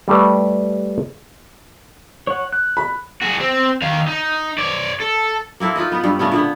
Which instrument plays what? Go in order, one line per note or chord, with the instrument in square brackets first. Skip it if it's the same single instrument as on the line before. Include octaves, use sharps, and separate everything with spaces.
[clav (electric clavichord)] G3 A3 B4 D5
[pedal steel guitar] C#5 F#5
F#6
[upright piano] B5
[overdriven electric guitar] F#4 G#4
C4
D#3 F5
D#4
C#5 D5
A4
[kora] A#3 C4 E4 A4
D#4 F4 B4 D#5
B3 B4
G2 G3
C#3 A3 B3 C#4
A#2 D3 B3